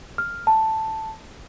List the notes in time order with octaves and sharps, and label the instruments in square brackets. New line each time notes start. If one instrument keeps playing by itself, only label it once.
[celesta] F6
A5